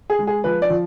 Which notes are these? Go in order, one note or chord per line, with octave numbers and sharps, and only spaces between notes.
G#4
G#3
G#4
F3 B4
D5
F3